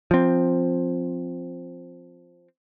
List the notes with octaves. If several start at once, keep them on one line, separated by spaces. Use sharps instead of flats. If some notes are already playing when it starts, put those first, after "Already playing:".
F3 C4